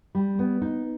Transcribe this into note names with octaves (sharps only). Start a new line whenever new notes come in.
G3
B3
D#4